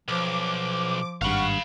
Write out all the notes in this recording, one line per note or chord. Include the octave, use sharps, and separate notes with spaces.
B1 F3 D6
G#1 G2 F5 F#5 B5 C#6 F6